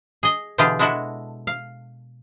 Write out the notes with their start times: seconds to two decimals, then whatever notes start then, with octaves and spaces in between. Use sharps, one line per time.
0.23 G#4 D#5
0.58 B2 D3 E3 F4 G4 G#4
0.79 G#3 D4 E4 F#4 A4
1.47 F5